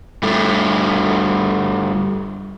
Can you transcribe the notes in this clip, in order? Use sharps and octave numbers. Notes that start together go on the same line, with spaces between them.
G2 A3